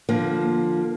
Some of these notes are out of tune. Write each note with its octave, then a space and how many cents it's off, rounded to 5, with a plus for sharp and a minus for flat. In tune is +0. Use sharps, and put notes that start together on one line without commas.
D3 +25 F3 +0 A#3 +15